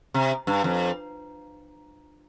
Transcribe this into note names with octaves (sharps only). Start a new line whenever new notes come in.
C3
G2
F2